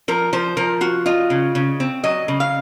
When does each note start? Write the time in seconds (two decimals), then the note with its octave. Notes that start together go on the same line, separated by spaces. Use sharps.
0.08 F3 A#4
0.33 F3 C5
0.57 F3 A#4
0.81 F4 F#4
1.06 F4 D#5
1.30 C#3
1.55 C#3
1.80 C4
2.04 F#3 D#5
2.28 C#3
2.40 F5